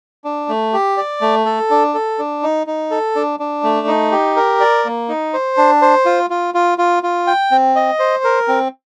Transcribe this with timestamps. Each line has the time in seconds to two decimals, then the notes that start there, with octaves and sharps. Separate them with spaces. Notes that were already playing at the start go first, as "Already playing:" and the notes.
0.25 D4
0.49 A3
0.73 G4
0.97 D5
1.21 A3
1.45 A4
1.70 D4
1.94 A4
2.19 D4
2.43 D#4
2.67 D#4
2.91 A4
3.15 D4
3.40 D4
3.63 A3
3.87 D#4
4.11 G4
4.36 A#4
4.60 D5
4.85 A#3
5.09 D#4
5.33 C5
5.57 D4
5.82 C5
6.05 F4
6.30 F4
6.54 F4
6.78 F4
7.03 F4
7.27 G5
7.51 C4
7.76 D#5
7.99 C5
8.24 A#4
8.48 C4